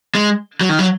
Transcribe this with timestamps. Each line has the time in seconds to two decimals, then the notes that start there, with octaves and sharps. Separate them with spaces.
0.15 G#3
0.61 F#3
0.69 D#3
0.79 F#3